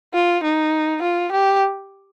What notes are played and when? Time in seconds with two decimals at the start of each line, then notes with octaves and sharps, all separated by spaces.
0.14 F4
0.44 D#4
1.03 F4
1.32 G4